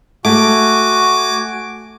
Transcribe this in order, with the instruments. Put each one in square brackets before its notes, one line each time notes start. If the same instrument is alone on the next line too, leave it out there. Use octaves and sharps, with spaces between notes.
[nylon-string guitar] A3 [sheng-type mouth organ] F#4 G#5 [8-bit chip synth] D6